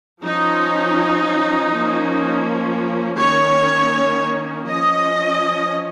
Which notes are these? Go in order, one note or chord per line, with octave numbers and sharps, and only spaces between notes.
F3 C#4 D#4
F3 A#3 C#4
D#3 A#3 C#4 C#5
F3 C#4 D#5